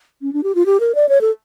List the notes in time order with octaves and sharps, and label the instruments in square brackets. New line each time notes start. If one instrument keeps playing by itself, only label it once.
[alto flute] C#4
D4
G4
F4
G4
A#4
D5
C#5
A4